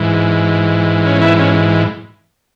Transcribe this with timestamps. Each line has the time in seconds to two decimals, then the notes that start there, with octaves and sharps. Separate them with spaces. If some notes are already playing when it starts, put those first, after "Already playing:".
Already playing: G#2 E3
1.06 C#4
1.22 B3 E4
1.39 C#4